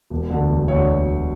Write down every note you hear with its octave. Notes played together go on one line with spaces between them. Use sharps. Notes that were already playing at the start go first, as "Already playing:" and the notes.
E1
D2 D3
E1
D2 D3 C#5